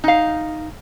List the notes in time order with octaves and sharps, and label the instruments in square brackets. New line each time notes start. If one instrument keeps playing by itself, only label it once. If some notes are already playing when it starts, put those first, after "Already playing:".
[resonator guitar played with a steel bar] D#4 F5